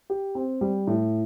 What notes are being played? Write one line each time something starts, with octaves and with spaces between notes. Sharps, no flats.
G4
C4
G3
A2